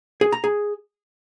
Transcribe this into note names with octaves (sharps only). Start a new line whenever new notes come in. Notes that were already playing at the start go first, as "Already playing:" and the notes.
G#4
A#5
G#4